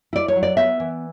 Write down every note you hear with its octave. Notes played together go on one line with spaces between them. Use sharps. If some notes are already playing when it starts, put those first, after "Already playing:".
E4 D5
C#5
F#3
D5
B3 E5
E3